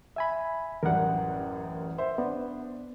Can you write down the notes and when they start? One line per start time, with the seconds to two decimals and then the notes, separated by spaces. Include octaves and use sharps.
0.16 E5 G#5 B5
0.83 A1 F#2 G3 A#4 F#5
1.98 C5 E5
2.18 B3 D4